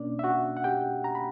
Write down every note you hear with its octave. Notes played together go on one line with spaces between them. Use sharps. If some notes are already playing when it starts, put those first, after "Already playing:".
Already playing: B2 A#3 C#4 D4 D5
E5
F#4 F#5
F#5
G4 G5
A#5
B5